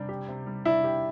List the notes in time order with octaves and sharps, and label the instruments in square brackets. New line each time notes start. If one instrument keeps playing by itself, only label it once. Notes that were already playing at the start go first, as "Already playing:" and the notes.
Already playing: [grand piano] C3 G3 D4
G4
C3
G3
[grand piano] D4 [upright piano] E4
[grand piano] G4